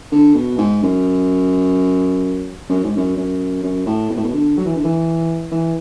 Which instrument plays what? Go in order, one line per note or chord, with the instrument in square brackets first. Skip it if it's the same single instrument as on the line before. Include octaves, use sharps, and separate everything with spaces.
[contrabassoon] D3
B2
G#2
F#2
F#2
G#2
F#2
F#2
F#2
A2
B2
A2
B2
D3
F#3
E3
D3
E3
E3